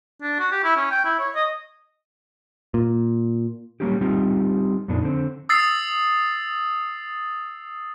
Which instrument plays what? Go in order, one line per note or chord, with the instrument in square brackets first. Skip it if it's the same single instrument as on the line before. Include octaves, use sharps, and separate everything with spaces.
[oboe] D4
F#4
G4
E4
C#4
G5
E4
C#5
D#5
[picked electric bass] A#2
[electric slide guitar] F#3 G3 A#3 C#4 D#4 G4
G3 C4 D#4 F4 G4
F2 A#2 B3 D4 D#4
D3 C4
[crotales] D#6 E6 A6 C7